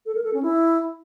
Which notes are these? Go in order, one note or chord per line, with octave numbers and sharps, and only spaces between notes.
A4
A#4
A4
C#4
E4